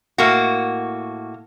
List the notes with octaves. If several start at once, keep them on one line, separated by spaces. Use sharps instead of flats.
A2 A#3 F#4